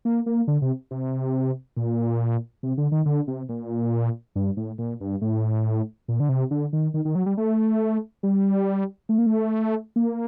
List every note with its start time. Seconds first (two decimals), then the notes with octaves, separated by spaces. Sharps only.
0.05 A#3
0.26 A#3
0.48 D3
0.62 C3
0.91 C3
1.77 A#2
2.63 C3
2.77 D3
2.92 D#3
3.06 D3
3.28 C3
3.49 A#2
4.35 G2
4.57 A2
4.78 A#2
5.01 G2
5.21 A2
6.08 A#2
6.20 D3
6.29 C3
6.51 D3
6.73 D#3
6.94 D#3
7.05 D#3
7.15 F#3
7.26 G3
7.37 A3
8.23 G3
9.09 A3
9.18 A#3
9.26 A3
9.96 A#3